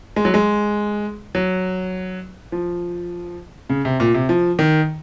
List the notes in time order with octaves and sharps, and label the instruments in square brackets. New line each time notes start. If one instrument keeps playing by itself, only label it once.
[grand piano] G#3
F#3
G#3
F#3
F3
C#3
C3
A#2
C3
F3
D#3